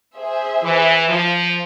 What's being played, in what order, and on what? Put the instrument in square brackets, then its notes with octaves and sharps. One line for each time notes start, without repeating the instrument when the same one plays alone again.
[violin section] G#4 C5 E5
[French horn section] E3
F3